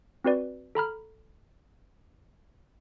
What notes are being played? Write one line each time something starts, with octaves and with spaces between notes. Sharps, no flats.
C4 F#4 B4 D5
A4 A#5 B5 F6